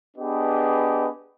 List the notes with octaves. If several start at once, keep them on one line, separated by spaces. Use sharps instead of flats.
B3 D4 G4 G#4 B4 D#5